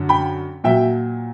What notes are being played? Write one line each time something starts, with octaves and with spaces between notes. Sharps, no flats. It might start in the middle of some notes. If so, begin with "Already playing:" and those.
Already playing: F#2 D3
G5 B5
A#2 F#3 E5 G5